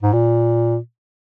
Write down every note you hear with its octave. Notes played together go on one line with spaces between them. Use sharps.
G#2
A#2